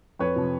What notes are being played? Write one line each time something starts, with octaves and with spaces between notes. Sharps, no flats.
F2 B4 C#5
C3 F3